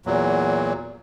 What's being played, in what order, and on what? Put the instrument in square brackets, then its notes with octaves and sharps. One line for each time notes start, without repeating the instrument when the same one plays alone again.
[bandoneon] E2 A#2 F#3